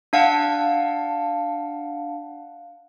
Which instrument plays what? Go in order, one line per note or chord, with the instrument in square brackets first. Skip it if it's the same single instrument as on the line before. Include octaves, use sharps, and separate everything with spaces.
[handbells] D4 F5 F#5 A5